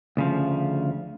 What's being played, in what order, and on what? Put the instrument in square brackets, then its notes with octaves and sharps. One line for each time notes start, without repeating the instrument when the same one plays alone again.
[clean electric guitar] D2 C#3 F3